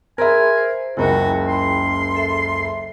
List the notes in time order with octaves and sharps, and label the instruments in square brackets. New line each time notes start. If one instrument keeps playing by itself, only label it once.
[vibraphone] G#4 B5 C6 [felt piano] A#4 E5 [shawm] G#5
[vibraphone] C5
[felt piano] F#1 C#2 A#4 [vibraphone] E4 G5 B5 [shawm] F#4
[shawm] C6
[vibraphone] A4 E5